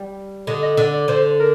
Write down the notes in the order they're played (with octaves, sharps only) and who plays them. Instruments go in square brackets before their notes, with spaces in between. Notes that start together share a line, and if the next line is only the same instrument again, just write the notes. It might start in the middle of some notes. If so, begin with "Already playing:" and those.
Already playing: [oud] G3
[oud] D3 [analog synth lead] D#5
[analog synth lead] D#5
[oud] D3 [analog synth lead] D5
[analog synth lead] D5
[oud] D3 [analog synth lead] C5
[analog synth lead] A#4